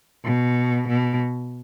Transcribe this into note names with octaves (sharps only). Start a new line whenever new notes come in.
B2
B2